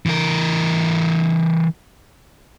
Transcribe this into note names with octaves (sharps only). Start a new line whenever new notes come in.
E3 A#4